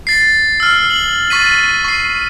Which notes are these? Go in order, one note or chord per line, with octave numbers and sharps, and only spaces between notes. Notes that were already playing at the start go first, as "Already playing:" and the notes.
A6 C7
E6 F6
F#7
C#6 A6 B6 D#7
C#6 C7